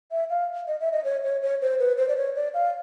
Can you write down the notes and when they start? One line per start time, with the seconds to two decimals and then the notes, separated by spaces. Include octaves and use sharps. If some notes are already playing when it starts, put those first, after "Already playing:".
0.11 E5
0.30 F5
0.68 D#5
0.80 E5
0.93 D#5
1.04 C#5
1.24 C#5
1.42 C#5
1.61 C5
1.79 B4
1.98 C5
2.08 D5
2.17 C#5
2.35 D5
2.54 F5